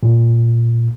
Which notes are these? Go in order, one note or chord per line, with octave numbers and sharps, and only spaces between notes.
A#2